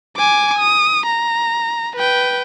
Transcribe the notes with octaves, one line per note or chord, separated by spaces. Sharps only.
G#5 D6
D#6
A#5
B4 G5